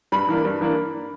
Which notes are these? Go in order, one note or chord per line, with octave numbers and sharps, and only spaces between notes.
G2 B5
E3 A#3 D4
G2
E3 A#3 D4